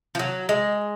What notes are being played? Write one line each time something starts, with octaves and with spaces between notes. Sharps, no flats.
F3
F#3
G#3